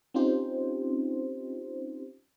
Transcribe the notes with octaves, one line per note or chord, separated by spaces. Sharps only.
C4 C#4 D#4 F4 G4 C5